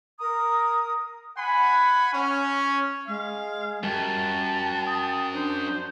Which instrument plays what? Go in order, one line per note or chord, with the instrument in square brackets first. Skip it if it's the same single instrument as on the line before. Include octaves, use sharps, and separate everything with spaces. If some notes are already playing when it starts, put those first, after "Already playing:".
[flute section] A#4 A#5 D#6
[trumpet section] F#5 G#5 B5
C#4
[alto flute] G#3 [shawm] F5
[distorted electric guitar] F#2 [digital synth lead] G3 [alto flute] G5 [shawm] A5
[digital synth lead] D#6
[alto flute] D4 [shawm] C5